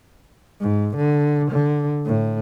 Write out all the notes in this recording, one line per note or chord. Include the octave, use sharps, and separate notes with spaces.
G#2
D3
D3
A2